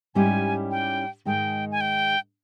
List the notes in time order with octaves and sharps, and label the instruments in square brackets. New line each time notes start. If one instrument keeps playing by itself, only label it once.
[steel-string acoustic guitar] G#2 G3 C#4 E4 G4 [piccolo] G#5
[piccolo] G5
[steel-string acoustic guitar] G#2 D#3 G#3 D#4 [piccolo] G5
[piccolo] G#5
G5